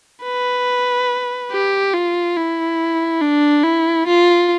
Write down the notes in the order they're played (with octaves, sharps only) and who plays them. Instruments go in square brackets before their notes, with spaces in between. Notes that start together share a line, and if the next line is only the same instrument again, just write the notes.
[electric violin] B4
G4
F4
E4
D4
E4
F4